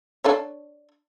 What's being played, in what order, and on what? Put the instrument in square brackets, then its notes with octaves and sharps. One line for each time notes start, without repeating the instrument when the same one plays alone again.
[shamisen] D4 A4 C#5